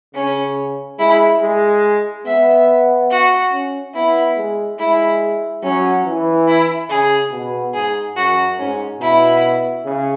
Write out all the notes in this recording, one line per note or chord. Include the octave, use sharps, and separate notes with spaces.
C#3 C#4
G#3 E4
G#3
B3 E5
F#4
C#4
B3 E4
G#3
G#3 E4
F#3 C#4
E3
E4
C#3 G#4
B2
G#2 G#4
F#2 F#4
G#2 C#4
B2 E4
C#3